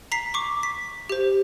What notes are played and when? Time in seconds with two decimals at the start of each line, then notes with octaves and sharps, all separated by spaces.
0.12 A#5 B6 C7
0.34 C#6 D6
0.63 B6
1.09 G4 C5